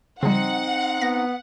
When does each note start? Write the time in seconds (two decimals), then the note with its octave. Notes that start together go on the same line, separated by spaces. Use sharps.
0.23 C#3 F3 G3 C4 D#4 F#5
1.01 B3 A#6